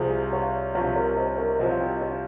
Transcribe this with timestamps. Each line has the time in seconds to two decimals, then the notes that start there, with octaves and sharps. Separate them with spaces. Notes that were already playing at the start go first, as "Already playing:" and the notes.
Already playing: C2 C3 F3 G#4 C5
0.33 C#5 F5
0.75 C2 C3 F3 C#5 F5
0.96 A#4 C#5
1.17 C5 D#5
1.38 A#4 C#5
1.59 C2 C3 F3 C5 D#5
1.70 F5
1.80 D#5 G5
1.97 D#5
2.01 C#5 F5